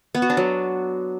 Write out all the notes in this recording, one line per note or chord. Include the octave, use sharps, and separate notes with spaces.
B3
F#4
D4
F#3